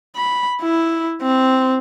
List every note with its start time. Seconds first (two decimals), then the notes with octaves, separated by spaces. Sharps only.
0.16 B5
0.61 E4
1.22 C4